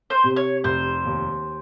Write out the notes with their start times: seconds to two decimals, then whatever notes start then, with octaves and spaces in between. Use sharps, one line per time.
0.10 C5
0.24 C3
0.36 C#5
0.64 F1 C5
1.05 D#2